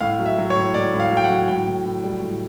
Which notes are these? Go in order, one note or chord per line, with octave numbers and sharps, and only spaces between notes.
A2 F5
F#3
E5
F#3
C#5
A2
A2 D5
A2
F5
F#3
G5
F#5
F#3
A2 G5
A2
A2
G3
A2